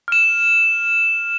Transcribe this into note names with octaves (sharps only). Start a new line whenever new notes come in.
F6 E7